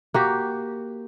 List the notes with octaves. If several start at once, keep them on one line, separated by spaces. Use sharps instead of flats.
A#3 F#4 G4